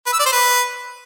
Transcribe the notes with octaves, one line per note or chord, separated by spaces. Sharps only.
B4
E6
D5
C5
B4